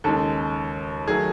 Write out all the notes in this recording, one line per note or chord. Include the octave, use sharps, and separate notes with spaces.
D#2 C#3 G#3 A4
D#3 F#3 A3 G#4